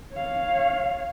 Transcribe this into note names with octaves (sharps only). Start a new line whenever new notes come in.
C#5 F5